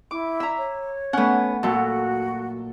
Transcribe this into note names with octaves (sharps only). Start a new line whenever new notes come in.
E4 D6
E5 A#5
C#5
A3 B3 C#4 F#5
A#2 F#3 F#4 A4